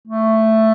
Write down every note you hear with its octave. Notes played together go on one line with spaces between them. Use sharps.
A3